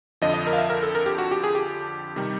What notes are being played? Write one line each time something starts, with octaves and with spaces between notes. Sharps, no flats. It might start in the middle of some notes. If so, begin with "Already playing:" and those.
F2 D3 F3 D#5
D#5
A#4
F5
E5
A#4
A4
A#4
G4
F#4
G4
G#4
G4
C3 D#3 G3